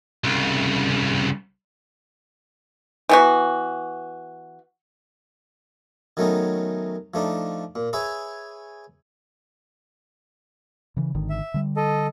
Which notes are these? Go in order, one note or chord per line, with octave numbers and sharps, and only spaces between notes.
C2 C#3
E3 B3 F#4
D#3 F#3 A3 B3 C#4 D#4
F3 A3 D4 D#4
A#2
G#4 B4 C#5 E5 G#5
C#3 E3
G#1 D3 D#3
E5
D3 G3
A4 D#5